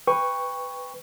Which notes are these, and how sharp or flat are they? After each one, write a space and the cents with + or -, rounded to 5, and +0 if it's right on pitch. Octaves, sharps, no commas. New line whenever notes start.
B4 +15 G5 +25 C#6 +0